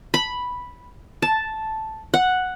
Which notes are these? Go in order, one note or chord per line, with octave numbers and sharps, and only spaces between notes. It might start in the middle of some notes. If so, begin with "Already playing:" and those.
B5
A5
F#5